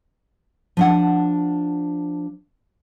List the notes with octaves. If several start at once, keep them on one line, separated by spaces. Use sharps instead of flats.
F3 D4 F#5